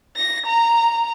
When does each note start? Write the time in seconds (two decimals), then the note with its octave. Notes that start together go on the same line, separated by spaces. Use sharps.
0.17 A#6
0.46 A#5